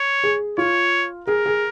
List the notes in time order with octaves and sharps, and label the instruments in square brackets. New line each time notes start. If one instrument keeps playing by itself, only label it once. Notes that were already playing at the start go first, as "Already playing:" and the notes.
Already playing: [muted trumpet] C#5
[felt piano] G#4
[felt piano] F4 [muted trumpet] C#5
[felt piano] G#4 [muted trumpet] A#4
[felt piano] G#4